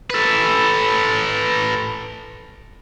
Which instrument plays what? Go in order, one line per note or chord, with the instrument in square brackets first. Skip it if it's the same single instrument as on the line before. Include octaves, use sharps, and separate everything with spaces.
[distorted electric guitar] A4 B4